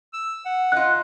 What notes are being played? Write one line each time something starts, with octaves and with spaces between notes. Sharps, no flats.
E6
F#5
D#4 F4 F#6